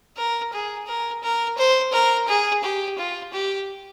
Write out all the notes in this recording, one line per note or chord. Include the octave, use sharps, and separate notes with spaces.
A#4
G#4
A#4
A#4
C5
A#4
G#4
G4
F4
G4